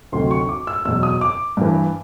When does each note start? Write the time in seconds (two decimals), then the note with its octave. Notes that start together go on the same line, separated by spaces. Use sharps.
0.12 D2 C3 D#3 F#3 C6
0.31 C#6
0.49 D6
0.67 E6
0.85 E2 B2 F#3 E6
1.03 D#6
1.21 D6
1.57 G2 E3